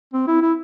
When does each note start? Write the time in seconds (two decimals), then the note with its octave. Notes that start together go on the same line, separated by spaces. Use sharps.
0.13 C4
0.28 E4
0.42 E4